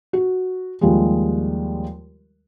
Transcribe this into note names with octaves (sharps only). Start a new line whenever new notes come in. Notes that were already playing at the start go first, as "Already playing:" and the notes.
F#4
D#2 F3 G3 G#3